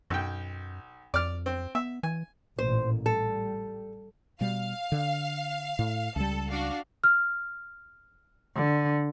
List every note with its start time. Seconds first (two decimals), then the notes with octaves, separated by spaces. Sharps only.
0.10 B1 F#2 G5
1.14 F2 D5 F6
1.46 C4
1.75 B3 E5
2.03 E3 G#5
2.59 A1 A#2 C5
3.06 G3 A4
4.41 B2 G3 F5
4.92 D3
5.79 A2
6.16 C#2 G3 A4
6.49 D4 F#4 F5
7.04 F6
8.56 D3